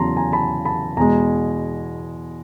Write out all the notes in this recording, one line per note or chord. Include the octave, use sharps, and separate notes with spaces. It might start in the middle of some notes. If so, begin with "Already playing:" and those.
Already playing: E2 C#3 F#3 A5 A#5 C6
G#5 A#5
A5 B5
A5 B5
E2 B2 G#3 G#5 A#5